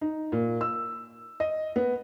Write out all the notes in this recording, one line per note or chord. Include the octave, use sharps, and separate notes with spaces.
D#4
A#2
E6
D#5
B3